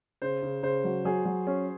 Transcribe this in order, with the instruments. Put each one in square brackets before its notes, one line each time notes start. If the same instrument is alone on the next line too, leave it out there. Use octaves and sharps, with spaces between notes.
[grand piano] C#3 [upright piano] C5
[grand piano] C#3
[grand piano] C#3 [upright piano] C5
[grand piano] F#3
[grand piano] F#3 [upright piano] G#4
[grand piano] F#3
C#4